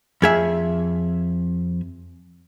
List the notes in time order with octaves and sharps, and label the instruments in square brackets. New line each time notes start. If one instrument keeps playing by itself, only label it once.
[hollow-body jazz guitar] F2 G#4 E5